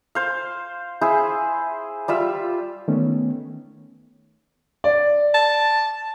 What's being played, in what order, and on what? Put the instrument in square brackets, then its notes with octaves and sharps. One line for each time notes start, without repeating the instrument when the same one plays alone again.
[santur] C5 F5
E4 G#4 C5
G3 F4 E5
[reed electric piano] D#3 A3 B3 C#4
[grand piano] D5
[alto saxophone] A5